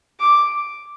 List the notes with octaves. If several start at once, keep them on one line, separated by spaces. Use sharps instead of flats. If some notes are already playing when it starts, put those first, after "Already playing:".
D6